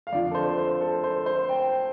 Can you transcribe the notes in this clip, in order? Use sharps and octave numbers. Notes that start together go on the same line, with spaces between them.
F5
F2 D3 F3 D5
A4
C5
C5
A4
C5
C5
G5